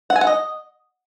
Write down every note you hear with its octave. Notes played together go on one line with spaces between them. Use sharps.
F#5
G#5
F#5
D#5